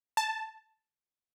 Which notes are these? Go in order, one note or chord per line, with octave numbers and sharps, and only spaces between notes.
A5